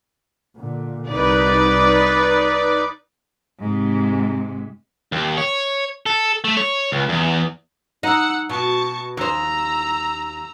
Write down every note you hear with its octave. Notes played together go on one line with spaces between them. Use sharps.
A#2 D3
C2 D#4 B4 D5
G#2 C3
D#2
C#5
A4
A3
C#5
C#2
E2
D#4 F#5 E6
B2 A5 C#6
D#2 C5 A#5 E6